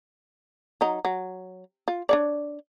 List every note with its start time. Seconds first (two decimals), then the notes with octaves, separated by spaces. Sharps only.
0.81 F#3 D#4
1.05 F#3
1.88 F4
2.09 D4 C#5 D5